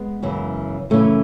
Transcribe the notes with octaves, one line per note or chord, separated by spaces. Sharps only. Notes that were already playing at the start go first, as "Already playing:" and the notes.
Already playing: G#3 B3
F#2 C#3 E3
F#2 C#3 E3 A3 C#4